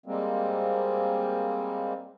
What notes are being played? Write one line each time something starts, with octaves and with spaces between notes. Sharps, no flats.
G3 G#3 A#3 C4